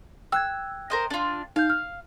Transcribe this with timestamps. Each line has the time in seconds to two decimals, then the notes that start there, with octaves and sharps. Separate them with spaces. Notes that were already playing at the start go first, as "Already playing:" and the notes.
0.32 G5 E6 F#6 G#6
0.90 A#4 C5 D#5
1.10 D4 F4
1.56 D#4 F5 G6
1.70 F6